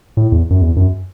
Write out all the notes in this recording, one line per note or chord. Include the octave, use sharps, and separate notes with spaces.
A2
E2
F#2
E2
F#2